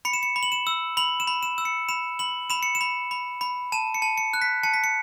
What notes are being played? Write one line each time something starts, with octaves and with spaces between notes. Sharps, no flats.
B5 C#7
E7
C#7
B5
F#7
E7
E6
B5 F#7
E7
B5
E7
E6
C#7
B5 E7
B5 F#7
B5 E7
C#7
E7
B5
B5
B5
A5 E7
C#7
A5
C#7
F#6
B6
A5 C#7
B6
C#7